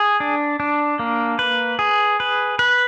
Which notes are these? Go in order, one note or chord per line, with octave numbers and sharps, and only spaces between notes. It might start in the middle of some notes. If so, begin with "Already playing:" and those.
Already playing: G#4
D4
D4
A#3
B4
G#4
B4
B4